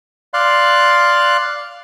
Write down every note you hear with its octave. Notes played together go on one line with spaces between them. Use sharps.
D5 F5 C6 F#6